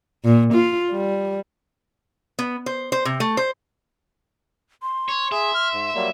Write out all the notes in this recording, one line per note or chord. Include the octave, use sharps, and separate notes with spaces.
A#2
F4
G3
B3
C5
C5
C3
A3
C5
C6
C#5
G#4 E5
F6
G#2
F#3 G3 A#3